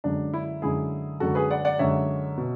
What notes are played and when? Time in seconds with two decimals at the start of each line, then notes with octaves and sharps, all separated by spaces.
0.04 F#2 D3 G#3 D4
0.34 E4
0.62 F#2 D3 G#3 E4 G#4
1.20 F#2 D3 G#3 F#4 A4
1.35 G#4 B4
1.51 D5 F#5
1.65 D5 F#5
1.79 F#2 D3 G#3 C#5 E5
2.38 B2